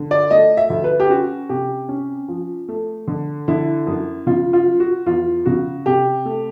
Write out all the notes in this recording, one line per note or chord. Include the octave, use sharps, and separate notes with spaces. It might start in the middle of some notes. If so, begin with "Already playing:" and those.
Already playing: D3
D5
A3 D#5
E5
D2
B4
G4
C#4 F#4
C3 G4
C#4
F3
A3
D3
D3 E4
F#2
C#3 F4
F4
F#3
F#4
E2 F4
C#3 F#4
C3 G4
A3